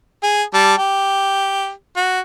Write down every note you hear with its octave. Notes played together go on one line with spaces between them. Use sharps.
G#4
G3 A5
G4
F#4